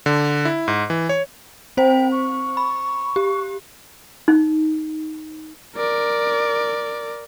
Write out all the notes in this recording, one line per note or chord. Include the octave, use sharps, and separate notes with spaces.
D3
E4
G#2
E3
C#5
C4 C5 G5
C#6
B5
G4
D#4
A#4 D5